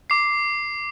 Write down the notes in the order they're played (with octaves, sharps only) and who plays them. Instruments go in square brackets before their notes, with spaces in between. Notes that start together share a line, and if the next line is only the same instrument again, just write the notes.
[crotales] D6 C7